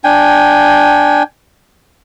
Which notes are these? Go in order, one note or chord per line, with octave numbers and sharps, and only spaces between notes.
D4 G5 G#5